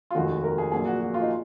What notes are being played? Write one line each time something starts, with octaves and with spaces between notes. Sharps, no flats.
F4
F1 D#2 D#3 G#3 F#4
A#4
G#4
A#1 A#2 F#3 A#3 G#4
F#4
F#4
F4
D#4